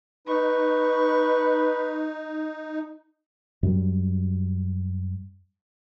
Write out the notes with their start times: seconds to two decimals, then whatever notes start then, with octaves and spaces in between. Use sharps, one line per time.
0.27 D#4 B4 C#6
3.63 F#2 G3